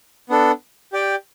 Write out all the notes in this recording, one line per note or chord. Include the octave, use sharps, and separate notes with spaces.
B3 D4 A4
G4 D5 G5